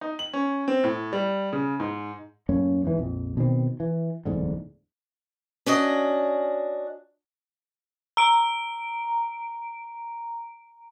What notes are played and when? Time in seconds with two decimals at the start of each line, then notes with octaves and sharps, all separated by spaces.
0.01 D#4
0.19 F#7
0.33 C#4
0.68 C4
0.84 A2
1.13 G3
1.53 C#3
1.80 G#2
2.49 F#2 A2 A#3 C#4
2.83 E2 G#2 E3
2.98 A#1 F2
3.37 B2 D#3 C4
3.80 E3
4.25 D1 E2 G#2 D3
5.66 C#4 D4 F#4 D#5
8.17 A#5 D7